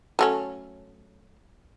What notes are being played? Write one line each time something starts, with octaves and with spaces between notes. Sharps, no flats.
F#3 A3 C#4